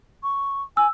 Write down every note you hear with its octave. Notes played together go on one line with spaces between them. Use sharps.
C#6
G#5 E6